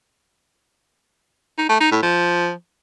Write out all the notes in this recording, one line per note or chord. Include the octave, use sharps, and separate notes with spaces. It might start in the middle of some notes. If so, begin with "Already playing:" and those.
D#4
A3
D#4
A2
F3